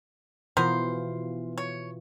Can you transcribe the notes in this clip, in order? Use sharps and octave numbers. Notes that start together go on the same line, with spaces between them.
B2 E3 B3 F4 A#4 C5
C#5